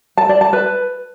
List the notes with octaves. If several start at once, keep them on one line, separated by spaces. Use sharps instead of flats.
A5
D5
A5
B4